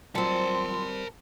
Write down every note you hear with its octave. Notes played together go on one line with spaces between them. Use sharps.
F#3 G3 C4 F4 A#4 A5 C6